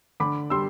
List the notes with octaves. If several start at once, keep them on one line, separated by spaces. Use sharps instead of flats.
D3 B5 D6
G3 C6 E6